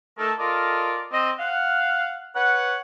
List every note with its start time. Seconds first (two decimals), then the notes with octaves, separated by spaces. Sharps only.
0.18 A3 D#4 A4 A#4
0.39 F4 A4 A#4 D5 D#5
1.12 C4 D#5
1.39 F5 F#5
2.36 B4 C#5 F#5